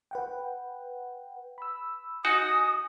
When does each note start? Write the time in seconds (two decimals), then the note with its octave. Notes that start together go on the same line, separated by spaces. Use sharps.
0.11 B4 F#5 G5
1.58 B5 E6
2.25 D#4 F#4 G#5 D#6